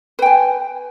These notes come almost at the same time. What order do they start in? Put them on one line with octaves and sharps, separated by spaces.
B4 G5 G#5